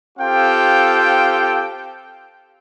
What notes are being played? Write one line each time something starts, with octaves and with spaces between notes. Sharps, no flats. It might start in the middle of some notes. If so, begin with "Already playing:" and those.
C4 F4 G4 A4 F5 G5